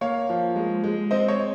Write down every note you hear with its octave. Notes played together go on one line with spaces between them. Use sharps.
A#3 C#5 F5
F3
G#3
G#3
C4 C5 D#5
C#5